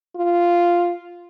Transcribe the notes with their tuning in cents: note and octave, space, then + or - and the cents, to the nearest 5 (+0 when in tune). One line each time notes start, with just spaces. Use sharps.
F4 -5